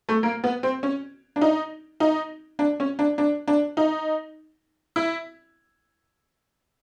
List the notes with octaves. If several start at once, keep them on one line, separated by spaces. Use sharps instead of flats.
A3
A#3
B3
C4
C#4
D4
D#4
D#4
D4
C#4
D4
D4
D4
D#4
E4